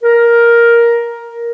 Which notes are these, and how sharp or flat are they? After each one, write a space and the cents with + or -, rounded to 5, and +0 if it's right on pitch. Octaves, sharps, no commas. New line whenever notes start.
A#4 +10